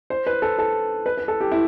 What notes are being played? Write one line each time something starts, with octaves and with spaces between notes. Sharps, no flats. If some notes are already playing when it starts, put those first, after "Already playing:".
C5
B4
A4
A4
B4
B4
A4
G4
E4